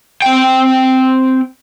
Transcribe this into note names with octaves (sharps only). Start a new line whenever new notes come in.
C4 G5